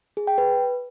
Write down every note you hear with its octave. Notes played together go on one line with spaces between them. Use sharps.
G#4
G5
B4